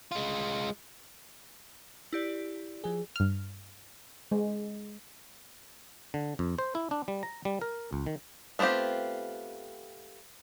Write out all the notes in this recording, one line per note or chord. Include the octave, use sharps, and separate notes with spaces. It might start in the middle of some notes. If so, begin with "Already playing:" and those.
G#3 F4
E4 G4 D5
F3 G#4
G2 F6
G#3
D3
F2
C5
E4
D4
G3
A#5
G3
A#4
C#2
D#3
A3 B3 C4 F4 G4